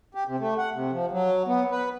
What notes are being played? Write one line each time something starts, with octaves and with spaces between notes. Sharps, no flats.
G4
C3
A3
F#5
C3
F3
F#3
B3
B4